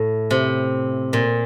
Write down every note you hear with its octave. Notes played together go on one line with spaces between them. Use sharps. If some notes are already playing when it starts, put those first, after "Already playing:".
Already playing: A2
C3
A#2